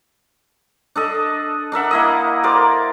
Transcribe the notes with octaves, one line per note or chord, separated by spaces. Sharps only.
D4 A4 D#5
D4 A#4 E5 F#5
A#3 E4 D#5
A#4 C5 D5 A#5